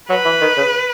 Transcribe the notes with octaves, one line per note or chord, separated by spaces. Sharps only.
F#3 B4
E3
D#3
C#3